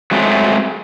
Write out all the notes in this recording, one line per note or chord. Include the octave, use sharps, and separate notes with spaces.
F#3 G#3 A3 C4